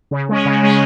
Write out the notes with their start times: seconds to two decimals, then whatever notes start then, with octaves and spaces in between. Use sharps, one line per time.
0.11 C#3
0.29 G#3 C#4
0.45 C#3
0.63 G#3 C#4